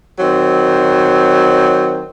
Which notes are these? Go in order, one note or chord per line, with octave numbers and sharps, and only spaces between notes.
D#3 F#3 C4